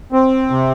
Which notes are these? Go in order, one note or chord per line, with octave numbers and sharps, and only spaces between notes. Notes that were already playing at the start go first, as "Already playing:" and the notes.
C4
C3